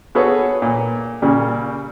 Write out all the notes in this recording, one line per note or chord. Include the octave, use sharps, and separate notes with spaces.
B3 F#4 G#4 A4 B4 C#5
A#2
A#2 C#3 G3